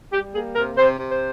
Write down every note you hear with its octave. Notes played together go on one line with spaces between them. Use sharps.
G3 G4
A#3 G#4
C3 A#4
C3 C5
C3
C5